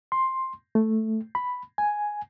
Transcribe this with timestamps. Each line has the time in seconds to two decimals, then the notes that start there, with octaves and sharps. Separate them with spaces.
0.12 C6
0.75 A3
1.35 B5
1.78 G#5